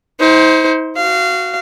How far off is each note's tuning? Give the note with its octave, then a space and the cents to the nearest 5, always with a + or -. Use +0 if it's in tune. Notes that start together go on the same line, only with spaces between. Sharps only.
D#4 +45 C5 +0
F#4 +0 F5 -25